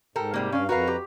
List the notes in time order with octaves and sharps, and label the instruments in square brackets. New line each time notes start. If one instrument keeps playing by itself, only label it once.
[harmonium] G#2 [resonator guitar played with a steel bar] G4 A4 A#4
[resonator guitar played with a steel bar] C3 G3 A#3
[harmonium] G2 F5 [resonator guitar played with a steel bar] C#4 D5
[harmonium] F2 B4 A#5 [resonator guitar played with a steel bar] F#4 A#4 F5
[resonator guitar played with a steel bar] G4